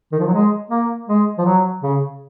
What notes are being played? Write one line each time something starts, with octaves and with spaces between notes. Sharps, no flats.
D#3
F3
F#3
G#3
A#3
G#3
F3
F#3
C#3